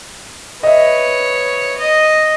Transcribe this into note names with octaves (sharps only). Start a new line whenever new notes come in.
B4 C#5 D#5 E5
D#5